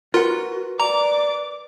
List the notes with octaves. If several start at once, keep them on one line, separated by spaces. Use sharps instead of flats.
F4 F#4 A#4 B4 F#5
D5 A#5 D6